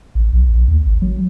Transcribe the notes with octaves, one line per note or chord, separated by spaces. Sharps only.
A1
B1
A#1
D#2
G#1
F#3